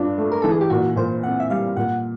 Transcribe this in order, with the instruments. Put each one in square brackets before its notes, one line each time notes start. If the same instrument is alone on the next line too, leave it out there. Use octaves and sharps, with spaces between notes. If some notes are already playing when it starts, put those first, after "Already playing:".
Already playing: [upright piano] G2 D4 [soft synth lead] F4
[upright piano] A3
[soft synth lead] A#4
[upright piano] E3 [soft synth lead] A4
[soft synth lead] G#4
G4
[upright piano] A#2 [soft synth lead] F#4
[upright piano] A#2 [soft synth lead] C5
[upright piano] C4 [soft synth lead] F#5
[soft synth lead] E5
[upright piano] G3 [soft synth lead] F5
[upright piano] A#2 [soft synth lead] F#5